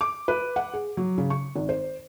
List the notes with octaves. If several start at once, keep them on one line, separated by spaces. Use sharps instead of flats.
D6
B4
F#5
G#4
F#3
C#3
C#6
G#1
C5